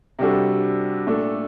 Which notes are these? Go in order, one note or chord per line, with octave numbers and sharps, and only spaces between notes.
C3 G3 D4 F#4 A4
A#2 A3 D4 A4